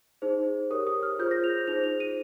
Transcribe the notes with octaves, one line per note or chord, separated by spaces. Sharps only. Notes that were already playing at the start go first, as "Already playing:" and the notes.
D#4 G#4 C5
G4 A#4 C#5 D#6
D#6
F6
F4 G#4 C5 G6
A#6
F7
D#4 G#4 C5 F7
F7
D#7